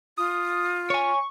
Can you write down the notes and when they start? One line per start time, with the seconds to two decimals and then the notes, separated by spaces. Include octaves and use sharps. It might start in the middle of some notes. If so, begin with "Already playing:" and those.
0.18 F4 D#6
0.90 C#5 G#5 C#6